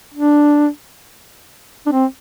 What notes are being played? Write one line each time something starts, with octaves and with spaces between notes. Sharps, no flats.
D4
D4
C4